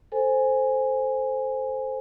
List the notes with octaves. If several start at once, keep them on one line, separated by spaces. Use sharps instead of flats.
A4 C5 G#5